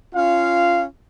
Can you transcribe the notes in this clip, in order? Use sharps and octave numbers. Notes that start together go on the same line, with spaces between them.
C#4 F4 F5